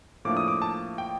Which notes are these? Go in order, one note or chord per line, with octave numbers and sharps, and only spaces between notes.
A2 F3 A#3 D4 D6
D#6
D6
A5
G5